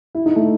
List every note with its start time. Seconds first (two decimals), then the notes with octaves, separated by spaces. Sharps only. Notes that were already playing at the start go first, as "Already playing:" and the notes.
0.15 E4
0.26 D#4
0.36 A3